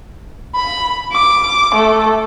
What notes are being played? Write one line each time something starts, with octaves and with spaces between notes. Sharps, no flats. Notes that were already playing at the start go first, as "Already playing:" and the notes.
B5
D6
A3